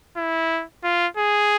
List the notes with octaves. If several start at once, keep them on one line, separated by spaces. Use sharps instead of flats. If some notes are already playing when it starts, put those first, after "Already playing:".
E4
F4
G#4